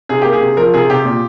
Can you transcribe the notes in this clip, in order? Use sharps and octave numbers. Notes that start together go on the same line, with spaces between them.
C3 G#4
A#3 G4
G#4
C3
F3 A#4
C3 G#4
C3 G4
A#2